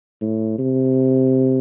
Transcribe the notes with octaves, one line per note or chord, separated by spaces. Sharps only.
A2
C3